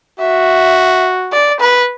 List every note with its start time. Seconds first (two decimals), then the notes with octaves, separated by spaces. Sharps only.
0.20 F#4 E5
1.33 D5
1.60 B4